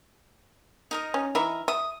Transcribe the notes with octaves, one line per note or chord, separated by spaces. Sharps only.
D#4 A#4 D#5
C#4
E3 D#4 E4 A#4 E5
E5 D#6